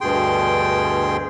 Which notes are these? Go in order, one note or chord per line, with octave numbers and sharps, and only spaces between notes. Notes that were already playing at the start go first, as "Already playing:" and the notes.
D2 G2 B2 G#4 G5 C6